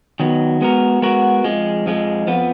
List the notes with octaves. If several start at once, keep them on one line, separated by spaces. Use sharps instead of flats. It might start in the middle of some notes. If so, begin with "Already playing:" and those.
D#3 F#3 B3
G#3 B3 F#4 A#4
G#3 B3 F#4 A#4
F2 F3 G#3
F2 F3 G#3
F2 F3 B3